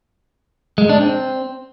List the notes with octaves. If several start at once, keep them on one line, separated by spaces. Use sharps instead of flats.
G#3
D4
C4